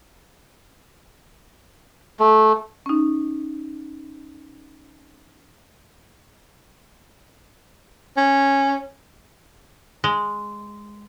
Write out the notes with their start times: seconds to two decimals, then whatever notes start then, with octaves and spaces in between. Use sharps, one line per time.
2.20 A3
2.86 C#4 D#4
8.17 C#4
10.04 G#3